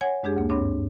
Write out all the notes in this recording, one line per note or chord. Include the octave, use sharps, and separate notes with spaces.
C#5 F#5 G#5 G#6
F#2 G#3 D4 G4 G#4
D2 A#3
G2 C4 D4 C#5